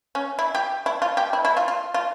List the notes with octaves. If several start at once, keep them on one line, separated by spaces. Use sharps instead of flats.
C#4
E4
G4
E4
F4
G4
E4
E4
F4
F4
F4